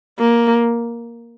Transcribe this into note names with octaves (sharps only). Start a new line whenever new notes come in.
A#3